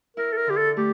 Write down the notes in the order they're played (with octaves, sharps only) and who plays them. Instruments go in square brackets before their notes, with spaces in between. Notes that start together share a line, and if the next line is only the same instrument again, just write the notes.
[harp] E4 [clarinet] A#4
[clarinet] A4
A#4
[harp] D3 [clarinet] G4
[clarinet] A4
[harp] A3 [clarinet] G4